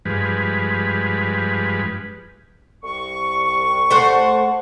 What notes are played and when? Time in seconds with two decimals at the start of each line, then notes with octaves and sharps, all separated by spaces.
0.05 G2 F3 G#3 B4
2.83 C2 C#6
3.91 A3 C5 F#5